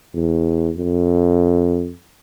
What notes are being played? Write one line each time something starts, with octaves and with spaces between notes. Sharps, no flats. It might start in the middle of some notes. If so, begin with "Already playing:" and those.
E2
F2